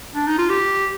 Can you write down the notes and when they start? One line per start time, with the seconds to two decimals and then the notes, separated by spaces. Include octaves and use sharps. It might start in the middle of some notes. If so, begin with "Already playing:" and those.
0.15 D4
0.27 D#4
0.38 F4
0.50 G4